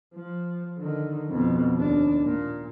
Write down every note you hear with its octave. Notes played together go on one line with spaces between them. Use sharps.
F3
D3 D#3
F2 B2
D#2 D4
A#2